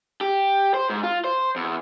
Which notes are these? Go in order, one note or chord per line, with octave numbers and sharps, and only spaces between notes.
G4
C5
G#2
F4
C5
E2